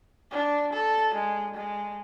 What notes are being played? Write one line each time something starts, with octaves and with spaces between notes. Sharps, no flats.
D4
A4
G#3
G#3